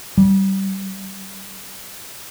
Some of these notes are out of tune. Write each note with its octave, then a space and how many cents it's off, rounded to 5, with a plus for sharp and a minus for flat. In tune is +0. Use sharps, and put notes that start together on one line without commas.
G3 -25